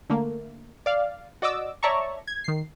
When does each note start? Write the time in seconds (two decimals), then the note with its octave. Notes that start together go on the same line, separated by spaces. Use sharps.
0.10 D3 A3 A#3
0.86 D5 F5
1.42 F#4 D5 D#5 D6 E6
1.83 C#5 D5 E5 A5 A#5 C#6
2.27 G#6
2.44 D#3 C7